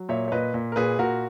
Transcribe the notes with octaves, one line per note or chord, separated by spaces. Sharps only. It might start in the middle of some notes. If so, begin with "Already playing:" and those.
Already playing: F#3
A#2 C#5 E5
C#5
A#2 B4 D#5
A#2
A#4
A#2 G#4 B4
A#2 F#4 A#4